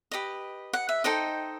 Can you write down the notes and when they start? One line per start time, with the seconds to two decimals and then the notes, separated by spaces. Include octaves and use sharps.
0.11 G4 B4 D#5
0.73 F#5
0.89 E5
1.04 D#4 A4 C5 D#5 G5